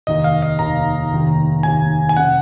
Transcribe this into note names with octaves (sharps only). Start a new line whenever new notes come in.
F1 D#2 D#3 A#3 D#5
F5
D#5
F1 D#2 D#3 A#3 A#5
F1 D#2 D#3 A#3
F1 D#2 D#3 A#3 G#5
G#5
F1 C#3 F#5